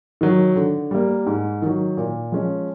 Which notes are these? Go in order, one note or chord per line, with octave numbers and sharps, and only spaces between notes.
D#3 F#3
D3
G3 A#3
G#2
D#3 F#3
A#2
F3 G#3 C#4